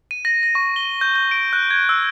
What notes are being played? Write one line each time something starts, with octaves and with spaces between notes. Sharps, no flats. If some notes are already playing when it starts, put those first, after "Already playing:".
D#7
A#6
A#6
C#6
G7
G6
G6
D7
F#6
G#6
E6